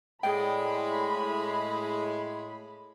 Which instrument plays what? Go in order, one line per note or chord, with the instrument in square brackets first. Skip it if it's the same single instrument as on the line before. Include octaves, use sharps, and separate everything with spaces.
[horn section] A2 G#3 [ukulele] G#4 D5 G5 [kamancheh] B5